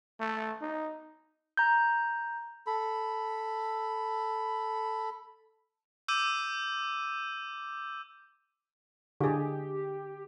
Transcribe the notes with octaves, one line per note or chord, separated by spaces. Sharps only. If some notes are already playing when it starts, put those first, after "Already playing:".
A3
D#4
A#5 G6
A4 B5
D6 E6 G6 D#7
D3 G4 G#4